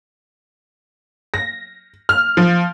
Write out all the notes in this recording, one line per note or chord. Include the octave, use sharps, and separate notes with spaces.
A#6
F6
F3